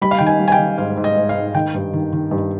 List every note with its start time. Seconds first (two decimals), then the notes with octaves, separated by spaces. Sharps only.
0.01 G3 B5
0.11 F5
0.19 D#3 G5
0.27 G#5
0.39 G3
0.48 G#5
0.52 G5
0.58 D#3
0.78 G#2 F5
0.97 G#2
1.04 D#5
1.16 G#2
1.29 F5
1.35 G#2
1.54 D#3 G5
1.74 G2
1.93 D#3
2.13 D#3
2.31 G2